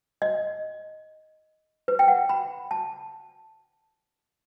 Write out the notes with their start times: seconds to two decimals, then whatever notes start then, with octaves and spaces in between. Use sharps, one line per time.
0.22 D#5
1.88 B4
1.99 G5
2.08 F#5
2.29 B5
2.71 A5